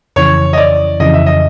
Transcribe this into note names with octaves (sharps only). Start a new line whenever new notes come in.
F2 C#3 E3 C#5
D#5
D5
F2 C#3 E3 D#5
E5
D#5